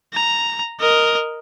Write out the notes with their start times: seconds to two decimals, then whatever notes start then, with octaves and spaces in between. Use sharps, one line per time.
0.14 A#5
0.80 A#4 D#5